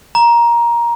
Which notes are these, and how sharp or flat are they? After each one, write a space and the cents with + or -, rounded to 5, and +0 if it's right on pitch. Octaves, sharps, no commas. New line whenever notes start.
A#5 +15